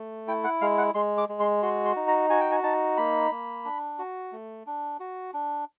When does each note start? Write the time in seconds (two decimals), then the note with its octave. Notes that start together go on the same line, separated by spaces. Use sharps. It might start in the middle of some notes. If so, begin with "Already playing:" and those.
Already playing: A3
0.28 E4 G5
0.44 F#5
0.61 G#3 F5
0.78 F#5
0.94 G#3 C6
1.18 D6
1.29 G#3
1.40 C6
1.62 F#4 C6
1.85 C6
1.96 D#4
2.08 A#5
2.30 F#4 G#5
2.41 G5
2.51 G#5
2.63 D#4 A5
2.97 A#3 B5
3.31 A#3
3.65 D4
3.99 F#4
4.32 A3
4.66 D4
5.00 F#4
5.34 D4